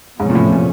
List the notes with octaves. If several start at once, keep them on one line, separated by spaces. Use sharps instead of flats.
E2 G#2 C3 F3 A3 C#4
A#2
A2
A#2